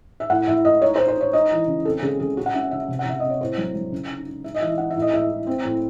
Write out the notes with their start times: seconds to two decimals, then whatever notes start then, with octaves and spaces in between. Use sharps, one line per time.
0.20 E5
0.30 A2 F#5
0.47 A2 E5
0.65 A2 D#5
0.82 D#4 C#5
0.96 C5
1.00 D#4
1.08 C5
1.16 D#4 C#5
1.33 D#4 D#5
1.51 E3
1.68 C#3
1.85 C4 A4
2.02 C#3 G#4
2.20 C#3 G#4
2.37 C#4 F#4
2.46 F#5
2.54 C#4 E5
2.71 C#3 E5
2.88 C3
2.99 F#5
3.05 C3 E5
3.20 C4 D#5
3.30 C#5
3.40 A2 C5
3.57 F#3
3.74 F#3
3.92 C#3
4.09 D#4
4.26 D#4
4.44 D#4 E5
4.55 D#5
4.61 E3 E5
4.78 D#4 F#5
4.90 E5
4.96 A2
5.02 D#5
5.13 A2 E5
5.29 A2
5.47 C4
5.65 A2